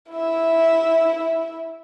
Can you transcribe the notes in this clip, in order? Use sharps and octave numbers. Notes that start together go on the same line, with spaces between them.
E4 E5